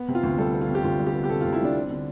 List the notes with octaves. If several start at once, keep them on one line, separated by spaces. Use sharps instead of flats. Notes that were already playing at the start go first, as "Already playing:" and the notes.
Already playing: B3
C3
F4
D2
G3 A4
B3
F4
C3
G4
D2 F4
G3
G4
B3
G4
C3 A4
F4
D2
E4
G3 D4
C4
D3